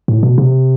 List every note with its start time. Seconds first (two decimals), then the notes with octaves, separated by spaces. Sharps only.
0.08 A2
0.23 B2
0.38 C3